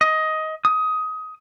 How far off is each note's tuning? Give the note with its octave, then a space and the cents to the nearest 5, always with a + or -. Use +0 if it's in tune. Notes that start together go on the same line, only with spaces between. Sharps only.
D#5 +15
D#6 +20